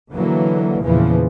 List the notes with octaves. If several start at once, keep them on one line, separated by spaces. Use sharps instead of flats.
D3 E3 F#3 A#3
E2 A#2 C#3 E3 F3